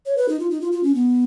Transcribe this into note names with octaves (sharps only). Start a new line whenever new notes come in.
C#5
B4
D#4
F4
D#4
F4
F4
C#4
B3